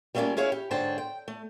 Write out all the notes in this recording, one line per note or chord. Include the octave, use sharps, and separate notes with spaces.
G3 A3 A#3 C4 C#4 F4
C#4 E4 G#4 C#5 F5
G4
G#2 D3 C5 C#5 G5 A5
G5
A3